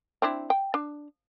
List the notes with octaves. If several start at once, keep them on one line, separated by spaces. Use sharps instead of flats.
C4 D4 E4
G5
D4